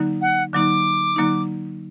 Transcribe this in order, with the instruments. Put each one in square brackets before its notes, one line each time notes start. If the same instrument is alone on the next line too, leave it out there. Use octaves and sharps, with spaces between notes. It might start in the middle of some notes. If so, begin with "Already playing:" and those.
Already playing: [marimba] D3 F#3 A#3 D#4
[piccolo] F#5
[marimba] D3 F#3 A#3 D#4 [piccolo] D6
[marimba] D3 F#3 A#3 D#4